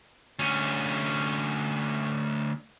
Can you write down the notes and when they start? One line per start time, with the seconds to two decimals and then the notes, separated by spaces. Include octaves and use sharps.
0.39 D2 C#4